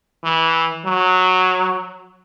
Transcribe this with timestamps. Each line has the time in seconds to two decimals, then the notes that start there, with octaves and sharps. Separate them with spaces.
0.24 E3
0.85 F#3